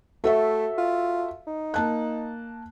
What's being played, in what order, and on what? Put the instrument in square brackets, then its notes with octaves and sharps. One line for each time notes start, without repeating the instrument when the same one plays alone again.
[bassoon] A3 [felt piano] F#4 A4 E5
[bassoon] F4
D#4
[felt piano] A#3 A5 F#6